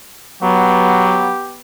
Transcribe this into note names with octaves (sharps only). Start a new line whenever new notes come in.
F#3 B3 G4